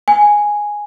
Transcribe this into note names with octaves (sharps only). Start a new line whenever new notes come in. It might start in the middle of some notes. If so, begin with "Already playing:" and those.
G#5